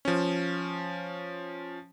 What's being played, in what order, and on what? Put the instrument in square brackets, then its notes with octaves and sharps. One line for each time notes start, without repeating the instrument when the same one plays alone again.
[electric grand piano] F3 C#4